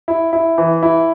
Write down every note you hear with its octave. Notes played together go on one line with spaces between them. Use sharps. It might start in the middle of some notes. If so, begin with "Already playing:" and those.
E4
E4
E3
E4